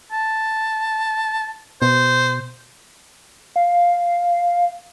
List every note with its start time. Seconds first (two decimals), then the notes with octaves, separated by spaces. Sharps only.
0.12 A5
1.82 B2 C5
3.56 F5